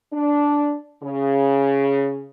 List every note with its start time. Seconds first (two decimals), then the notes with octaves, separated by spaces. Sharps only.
0.12 D4
1.03 C#3